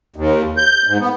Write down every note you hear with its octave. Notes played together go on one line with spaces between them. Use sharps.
D#2
G6
G#2
B3